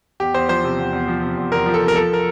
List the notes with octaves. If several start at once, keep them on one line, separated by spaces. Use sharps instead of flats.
E2 G4
E2 C5
F3 C5
C3
E2
E2
F3
C3
E2
E2 A#4
F3
A4
C3
A#4
F3 A4
A#4